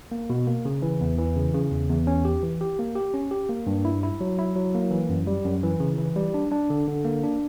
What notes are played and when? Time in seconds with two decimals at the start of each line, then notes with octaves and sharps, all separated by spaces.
0.12 A#3
0.30 B2
0.47 A#3
0.65 C#3
0.82 E3
1.01 E2
1.18 E3
1.36 C#3
1.54 C#3
1.71 E2
1.89 E2
2.07 C#4
2.25 G4
2.43 E3
2.61 G4
2.79 A#3
2.96 G4
3.14 C#4
3.31 G4
3.49 A#3
3.67 G2
3.85 E4
4.03 E4
4.21 F#3
4.39 E4
4.56 F#3
4.75 A#3
4.91 E3
5.09 F#2
5.27 G3
5.45 F#2
5.63 E3
5.80 C#3
5.98 E3
6.16 G3
6.34 D4
6.52 D4
6.70 D3
6.88 D3
7.04 A#3
7.23 D4